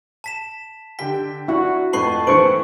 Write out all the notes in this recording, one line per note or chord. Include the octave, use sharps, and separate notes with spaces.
A5 B6 E7
D3 G4 G5 B6
D4 E4 F#4 F#5
F2 A2 B4 A5 C#6 C7 F#7
A2 E3 B4 C5 C#6 D7 F#7